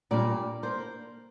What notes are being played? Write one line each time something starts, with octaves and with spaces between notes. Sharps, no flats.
A#2 G3 A#3 D4 D5
A#3 D4 C5